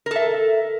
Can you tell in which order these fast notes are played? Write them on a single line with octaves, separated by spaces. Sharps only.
A#4 A4 E5